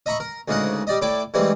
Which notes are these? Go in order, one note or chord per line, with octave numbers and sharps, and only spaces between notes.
D#5 E5 A#5 B5 C#6
A#4
D2 G#2 C#3 A#4 F#5 D#6
G3 D5 D#5
A2 E4 D5 G5 D6
G#2 E3 G3 A3 C4